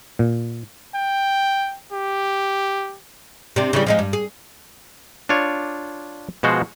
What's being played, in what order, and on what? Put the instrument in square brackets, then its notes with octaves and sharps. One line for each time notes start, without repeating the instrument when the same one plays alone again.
[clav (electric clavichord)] A#2
[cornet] G5
G4
[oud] C3 D4
C#3 E3 G3
F3 G#3 D#4
G2
G#4
[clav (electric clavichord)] D4 F4 C#5
B2 F3 G#3 F#4 C5